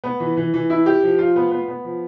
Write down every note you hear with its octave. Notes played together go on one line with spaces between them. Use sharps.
B3
E3
E3
E3
E4
G4
F3
F4
B3
B3
B3
F3